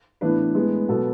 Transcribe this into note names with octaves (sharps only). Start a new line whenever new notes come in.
A2 E3 B3 D4 B4
A2 G#3 B3
B2 F#3 B3 A4